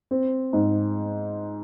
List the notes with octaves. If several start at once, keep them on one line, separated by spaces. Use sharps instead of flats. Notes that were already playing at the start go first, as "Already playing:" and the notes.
C4
G#2